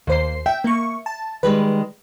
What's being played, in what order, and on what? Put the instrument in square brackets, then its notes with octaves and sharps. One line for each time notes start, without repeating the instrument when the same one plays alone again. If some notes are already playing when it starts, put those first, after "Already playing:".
[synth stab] D#2 C5 C7 [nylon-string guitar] A#3
[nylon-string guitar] E5 [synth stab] G5
[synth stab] A#3 C#6
A5
[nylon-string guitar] D#3 G3 G#3 [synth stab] B4